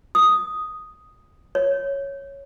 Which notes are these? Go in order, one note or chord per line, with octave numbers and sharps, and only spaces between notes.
D#6
C#5